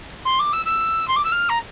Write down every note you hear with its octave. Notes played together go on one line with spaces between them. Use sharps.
C6
D6
E6
E6
C6
D6
E6
F6
A#5